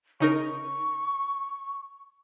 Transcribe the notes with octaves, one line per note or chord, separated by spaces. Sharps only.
C#3 D#4 A#4 C#6